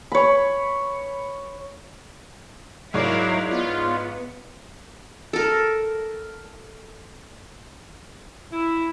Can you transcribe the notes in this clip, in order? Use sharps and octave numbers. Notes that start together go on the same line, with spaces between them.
C#5 B5
G#2 F#3 E4 A#4 C#5 D5 F5
B3 F4
A4 A#4
E4